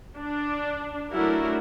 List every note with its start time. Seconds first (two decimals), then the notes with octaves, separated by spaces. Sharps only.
0.17 D4
1.12 F#3 A3 D4 E4 F#4 A#4